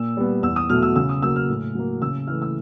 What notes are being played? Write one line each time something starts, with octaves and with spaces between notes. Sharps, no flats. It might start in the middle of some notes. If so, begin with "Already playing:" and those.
Already playing: A#2 E6
G3 B3
E2 E6
D#6
B2 F#3 A3 F6
E6
C#3 E6
D#6
F#3 A#3 E6
F6
A2
F#3 A#3
C#3 E6
E3 A3 F6
E6